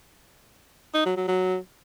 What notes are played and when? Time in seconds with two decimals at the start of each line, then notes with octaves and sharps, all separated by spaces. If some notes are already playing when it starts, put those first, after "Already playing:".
0.94 D#4
1.06 F#3
1.17 F#3
1.28 F#3